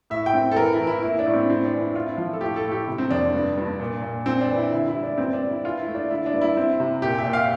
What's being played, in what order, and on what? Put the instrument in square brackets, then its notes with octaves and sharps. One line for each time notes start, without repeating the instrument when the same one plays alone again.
[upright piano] A2 E5
G5
C4
A4
E3 A#4
E4
E3
E4
A#3 E4
D4
A2
C4
A3 C4
D4
E3
E4
C4 F4
E4
F3 F4
A4
A2 G4
A4
A2
G4
C3
C4
F2 D4
G2
G2
A#2
A#2
C4
D4
E3
E4
D3 E4
E4
G3
D4
G2 C4
D4
C4
E4
E3 F4
E4
A3
D4
D3 E4
D4
G2
E4
C4
C3
A#2 G4
E5
A#2
F5